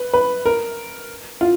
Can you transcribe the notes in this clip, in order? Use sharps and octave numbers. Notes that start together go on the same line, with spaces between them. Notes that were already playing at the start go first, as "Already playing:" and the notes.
Already playing: B4
B4
A#4
F4